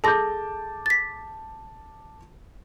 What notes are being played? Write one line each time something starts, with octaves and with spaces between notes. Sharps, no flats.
G#4 A4 A5 D6 G6 A#6
A6 B6